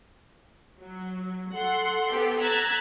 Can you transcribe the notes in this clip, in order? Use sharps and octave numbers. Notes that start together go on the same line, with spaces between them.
F#3
A4 F#5 C6
B3 G4 A4
A#5 E6 F#6 G#6 A6 B6